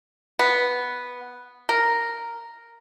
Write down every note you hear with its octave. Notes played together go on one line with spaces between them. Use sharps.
B3
A#4